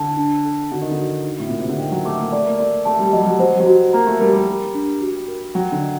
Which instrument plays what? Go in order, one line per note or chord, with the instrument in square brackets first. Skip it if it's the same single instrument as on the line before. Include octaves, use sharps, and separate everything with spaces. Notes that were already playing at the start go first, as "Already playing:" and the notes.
Already playing: [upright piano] D3 [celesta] A5
[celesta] D4
A4
[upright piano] D3 [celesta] F#4
[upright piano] D#3
D3
[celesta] F#4
D#4
[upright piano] A2
[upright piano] A#2 [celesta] D#4
[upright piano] C3
D3
[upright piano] D#3 [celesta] G5
[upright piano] F#3
[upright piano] A3 [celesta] D6
[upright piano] A#3
[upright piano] A3 [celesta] D5
[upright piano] A#3
[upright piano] A3 [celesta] D5
[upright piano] A3 [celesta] A5
[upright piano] G3
[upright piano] F#3 [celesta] D#5
[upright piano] G3
F#3
[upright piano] F#3 [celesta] C5
[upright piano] G3
F#3
[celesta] F#4
[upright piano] A#3 [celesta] A#5
[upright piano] A3
[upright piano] G3 [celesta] A#4
[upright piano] G3
[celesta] G4
D4
F#4
A#4
[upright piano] F#3 [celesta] G5
[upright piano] D3
[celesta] D#5